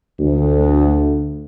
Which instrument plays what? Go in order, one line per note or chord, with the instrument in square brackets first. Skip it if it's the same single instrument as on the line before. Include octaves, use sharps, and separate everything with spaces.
[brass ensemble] D2